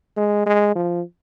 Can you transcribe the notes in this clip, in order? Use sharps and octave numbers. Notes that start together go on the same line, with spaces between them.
G#3
G#3
F3